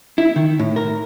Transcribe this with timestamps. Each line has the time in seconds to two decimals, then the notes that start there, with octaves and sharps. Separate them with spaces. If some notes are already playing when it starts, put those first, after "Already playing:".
0.18 E4
0.36 D#3
0.59 A2
0.76 A#4